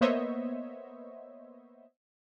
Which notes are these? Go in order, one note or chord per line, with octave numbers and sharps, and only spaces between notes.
A#3 B3 C5 C#5 D#5 E5